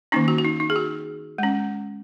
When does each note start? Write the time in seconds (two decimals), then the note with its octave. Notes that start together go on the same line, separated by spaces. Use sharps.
0.12 D#3 A#3 C#4 D#4
0.28 F#4
0.38 F#4
0.45 D#4
0.60 D#4
0.70 G#4
0.76 F#4
1.38 G#3 C#4